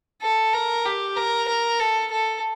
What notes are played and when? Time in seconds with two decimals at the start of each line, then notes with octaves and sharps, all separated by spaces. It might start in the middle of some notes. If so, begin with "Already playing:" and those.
0.22 A4
0.54 A#4
0.85 G4
1.16 A#4
1.48 A#4
1.80 A4
2.11 A4